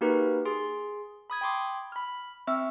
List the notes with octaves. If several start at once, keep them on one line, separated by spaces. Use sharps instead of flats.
A#3 D#4 F#4 G4 A#4 B4
G#4 C6
B5 D#6 G#6
G5 B5 C6 D6
B5 F6
C4 E5 C#6 E6 F6